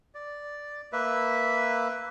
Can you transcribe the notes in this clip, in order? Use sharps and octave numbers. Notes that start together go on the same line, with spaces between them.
D5
A#3 B4 E5